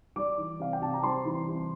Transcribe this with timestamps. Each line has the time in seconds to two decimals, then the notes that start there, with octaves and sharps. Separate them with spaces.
0.16 G3 D5 D6
0.38 E3
0.59 C3 F5
0.73 G5
0.81 C3 A5
0.93 A#5
1.03 G3 C5 C6
1.25 E3
1.48 C3